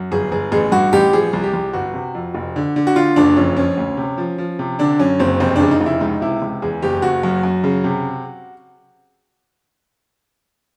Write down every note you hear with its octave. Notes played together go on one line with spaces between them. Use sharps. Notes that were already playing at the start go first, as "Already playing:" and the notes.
Already playing: F#2
G1 G#4
G1 G#4
A1 G#4
G2 F#4
A1 G4
F3 G#4
C2
G4
C2
G1 F#4
C3
F2
F1
D3
D3
F#4
D3 F4
F#1 D4
F2 C#4
F3 C#4
D2
C3
F3
F3
C3
D3 D4
F#2 C#4
F#1 C4
F1 C4
D4
C#3
D#4
F1
E4
C#2 D#4
C3 E4
C#2
E2 G#4
F#1 G4
F#1 F#4
F#2
F#2
C#3
C3